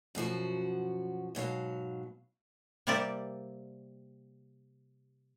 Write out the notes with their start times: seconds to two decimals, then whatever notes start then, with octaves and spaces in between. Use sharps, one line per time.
0.15 F#2 B2 F3 F#4
1.35 G#2 B2 F#3 F5
2.87 C3 G3 A#3 C4 G4 D5